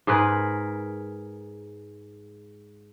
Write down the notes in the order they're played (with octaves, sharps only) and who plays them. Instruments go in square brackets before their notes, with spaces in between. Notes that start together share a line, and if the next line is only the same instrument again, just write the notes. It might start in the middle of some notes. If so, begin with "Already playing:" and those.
[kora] G#2 G#4 A#4 B4